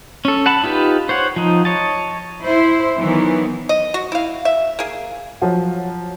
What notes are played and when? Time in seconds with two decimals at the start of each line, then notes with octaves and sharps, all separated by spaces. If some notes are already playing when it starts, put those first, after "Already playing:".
0.25 C#4 A4
0.46 F#5 A5 B5
0.63 D#4 F4 G4 B4
1.09 C5 C#5 F#5
1.36 F3 D#4
1.65 C#5 D#5 A5
2.43 E4 C5
2.99 D#3 E3 F#3 B3
3.69 D#5
3.94 F#4
4.12 E4 F5
4.45 E5
4.79 A#3 G#4
5.42 F3 F#3 F#4